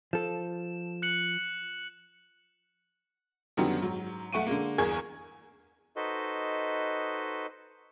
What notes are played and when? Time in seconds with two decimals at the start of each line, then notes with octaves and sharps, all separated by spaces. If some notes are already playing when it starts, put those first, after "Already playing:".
0.13 F3 A4 E7
1.02 F#6 C#7 F#7
3.57 F#2 D3 D#3 F#3 G3 B3
3.82 G#2 F#3
4.33 B1 A3 F#5 C#6 D7 D#7
4.47 D3 G#3 A#3
4.78 G1 E2 G#4 A#4 C#6 G#6
5.96 D#4 F#4 A4 B4 C5 D#5